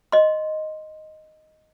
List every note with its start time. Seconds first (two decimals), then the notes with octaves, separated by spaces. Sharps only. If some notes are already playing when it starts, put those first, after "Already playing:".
0.12 D#5 C6